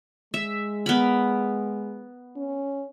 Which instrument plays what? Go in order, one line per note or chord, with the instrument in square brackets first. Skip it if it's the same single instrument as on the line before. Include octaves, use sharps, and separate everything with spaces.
[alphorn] G#3 [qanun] E5
[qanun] B3 A#4 B5
[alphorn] C#4